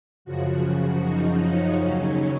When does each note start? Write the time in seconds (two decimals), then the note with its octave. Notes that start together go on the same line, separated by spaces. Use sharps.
0.25 F#2 C#3 F3 F#4
1.03 D#4
1.41 C#4
1.80 D#2 C#3 F#3